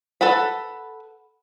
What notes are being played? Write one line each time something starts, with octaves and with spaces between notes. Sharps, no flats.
A4 B4 F#5 B5